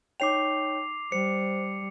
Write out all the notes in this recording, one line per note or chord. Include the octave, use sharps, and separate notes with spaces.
D#4 C#5 G5 D6 C7 F7
G3 C5 C#7